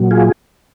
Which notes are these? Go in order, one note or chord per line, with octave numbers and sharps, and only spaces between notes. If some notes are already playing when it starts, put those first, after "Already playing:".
Already playing: A#2 F#3
F4 G#4